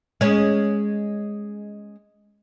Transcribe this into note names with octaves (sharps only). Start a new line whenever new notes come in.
G#3 C#4